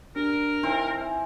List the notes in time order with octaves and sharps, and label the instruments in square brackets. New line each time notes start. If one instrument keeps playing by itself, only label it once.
[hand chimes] D4 G4 [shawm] A#4
[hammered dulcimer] E3 C4 C5 [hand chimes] D#4
[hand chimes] E5 G#5